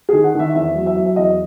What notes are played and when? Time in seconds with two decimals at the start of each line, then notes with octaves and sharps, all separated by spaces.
0.09 D#3 G#4
0.24 F#5
0.35 D#3 E5
0.55 E2 E5
0.75 F#3
0.86 E5
0.96 F#3
1.06 E5
1.16 E2 D#5